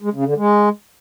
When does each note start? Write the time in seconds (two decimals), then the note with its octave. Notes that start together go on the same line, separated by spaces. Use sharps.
0.02 G#3
0.14 C#3
0.25 D3
0.37 G#3